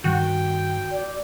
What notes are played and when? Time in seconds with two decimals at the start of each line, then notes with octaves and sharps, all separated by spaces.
0.04 G2 D#3 G3 F#4 G5
0.92 D5